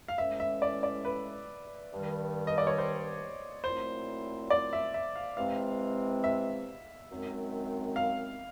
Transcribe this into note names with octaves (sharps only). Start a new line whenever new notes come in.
F5
A2 E3 G#3 C#4 E5
E5
D5
D5
B4
G2 D#3 G3
D#5
D5
C#5
C5
A#2 F#3 A3 C4 E4 C5
D5
E5
E5
F5
C3 E3 G#3 C4 F5
E5
F#2 D#3 G#3 C4
F5